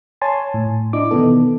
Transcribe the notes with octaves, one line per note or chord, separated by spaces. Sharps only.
C#5 G#5 A5 C6
A2
D4 E4 D#5 D6
B2 D#3 E3 B3 A4